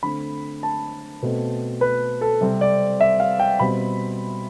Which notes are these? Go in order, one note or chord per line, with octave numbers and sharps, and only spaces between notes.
D3 A3 C4 B5
A5
B2 A3 C4
B4
A4
C3 G3 C4
D5
E5
F5
G5
B2 G3 C4 B5